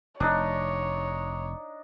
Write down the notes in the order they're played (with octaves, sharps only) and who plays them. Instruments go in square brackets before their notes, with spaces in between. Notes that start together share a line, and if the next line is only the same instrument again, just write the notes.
[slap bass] F1 [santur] D4 D#4 D#5 [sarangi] C#5